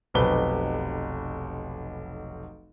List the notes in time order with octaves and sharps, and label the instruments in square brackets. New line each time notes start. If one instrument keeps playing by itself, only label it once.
[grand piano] F1 B1 C3 B4 G7